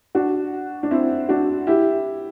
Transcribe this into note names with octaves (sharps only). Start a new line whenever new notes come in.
D4 F#4
D4
C4 E4
D4 F#4
E4 G4